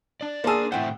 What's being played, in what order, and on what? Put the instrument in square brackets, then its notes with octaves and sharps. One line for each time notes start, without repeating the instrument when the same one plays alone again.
[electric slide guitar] D4 D5
[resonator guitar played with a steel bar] F3 G#4 [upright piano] A#3 A5 E6
[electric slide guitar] A2 C4 C5 [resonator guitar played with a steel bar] E3 A3 [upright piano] F#5 G5